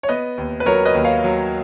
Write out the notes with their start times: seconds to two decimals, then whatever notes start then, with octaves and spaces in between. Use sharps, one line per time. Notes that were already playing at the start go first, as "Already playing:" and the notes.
0.03 C#5
0.08 B3 B4 D#5
0.38 D#2
0.60 B4
0.66 F#3 A#4 C#5
0.85 B4 D#5
0.95 D#2
1.04 C#5 F5
1.24 F#3